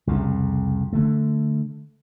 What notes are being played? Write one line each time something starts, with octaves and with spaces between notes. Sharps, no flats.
C2 F2 C#3
D3 A3